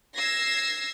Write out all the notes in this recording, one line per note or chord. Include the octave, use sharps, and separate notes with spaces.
E6 G#6 A#6 C7